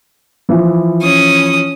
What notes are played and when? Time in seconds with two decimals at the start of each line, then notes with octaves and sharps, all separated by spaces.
0.49 E3 F3 E4
1.02 C#4 D#6